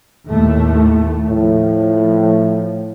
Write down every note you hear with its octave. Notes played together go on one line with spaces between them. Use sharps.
D#2 A2 A3
A2 F3